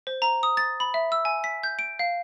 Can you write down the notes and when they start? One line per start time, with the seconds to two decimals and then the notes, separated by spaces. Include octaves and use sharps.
0.07 C5
0.22 A#5
0.43 D#6
0.57 A6
0.80 B5
0.94 E5
1.12 E6
1.25 G#5
1.44 B6
1.63 G6
1.79 D7
1.99 F5